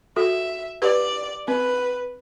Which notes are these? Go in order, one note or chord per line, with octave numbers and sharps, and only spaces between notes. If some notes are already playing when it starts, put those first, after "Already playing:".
F#4 A4 E5
G4 B4 D5
C4 B4